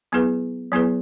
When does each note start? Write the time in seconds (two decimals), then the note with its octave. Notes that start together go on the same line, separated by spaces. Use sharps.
0.12 F#3 B3 E4 G#4 B4
0.72 F#3 B3 E4 G#4 B4